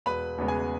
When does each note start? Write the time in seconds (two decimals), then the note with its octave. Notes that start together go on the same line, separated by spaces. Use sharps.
0.06 E1 B4 B5
0.38 E2 C#3 G#3 B3
0.48 G#4 G#5